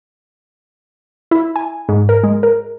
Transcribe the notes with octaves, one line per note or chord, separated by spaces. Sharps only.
E4
G#5
G#2
A#4
G#3
A#4